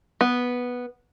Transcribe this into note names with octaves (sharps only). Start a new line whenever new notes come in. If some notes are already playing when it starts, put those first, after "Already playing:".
B3